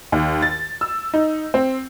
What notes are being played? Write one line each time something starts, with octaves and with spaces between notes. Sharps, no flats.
D#2
A6
E6
D#4
C4